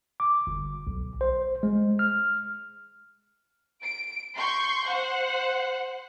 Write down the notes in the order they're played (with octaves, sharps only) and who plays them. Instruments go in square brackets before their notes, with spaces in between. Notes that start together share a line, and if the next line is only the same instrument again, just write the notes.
[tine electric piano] D6
G1
B1
C5
G#3
F6
[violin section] D7
C6 C#6 G6
C5 F#5